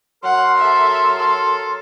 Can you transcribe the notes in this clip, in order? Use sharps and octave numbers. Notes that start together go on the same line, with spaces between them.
F#3 A#4 F#5 C6
A4 E5
A4